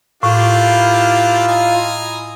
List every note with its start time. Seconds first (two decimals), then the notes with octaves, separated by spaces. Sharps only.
0.23 A2 A#3 D4 E4 F4 G4
1.48 D#5 G#5 A#5